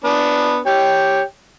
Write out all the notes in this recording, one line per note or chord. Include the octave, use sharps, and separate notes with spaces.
B3 D4
G4 C#5 G5